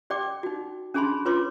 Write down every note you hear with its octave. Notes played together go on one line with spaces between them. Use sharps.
G4 D5 G5 D6
D#4 F#4
C#4 D4 G#4 A5 B5 C6
F4 B4 C#5 C6 D6